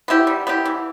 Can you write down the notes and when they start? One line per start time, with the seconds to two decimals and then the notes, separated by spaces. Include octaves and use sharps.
0.08 B3 E4 G4
0.27 G3
0.47 B3 E4 G4
0.66 E3